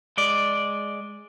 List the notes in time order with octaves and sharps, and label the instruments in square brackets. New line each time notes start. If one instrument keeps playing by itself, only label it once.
[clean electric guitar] G#3 D5